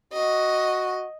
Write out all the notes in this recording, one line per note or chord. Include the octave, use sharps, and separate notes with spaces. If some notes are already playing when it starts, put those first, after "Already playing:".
F#4 D#5